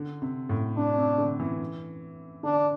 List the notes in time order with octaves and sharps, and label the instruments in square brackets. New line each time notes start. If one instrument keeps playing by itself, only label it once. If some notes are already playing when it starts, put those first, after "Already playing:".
Already playing: [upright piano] D3
C3
A2
[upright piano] C3 [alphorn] D4
[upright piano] C3
D3
E3
[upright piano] D3 [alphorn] D4